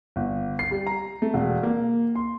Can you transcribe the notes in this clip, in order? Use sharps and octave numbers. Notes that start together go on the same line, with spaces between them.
G1
C7
G3
A#5
A3
E1
A#3
C6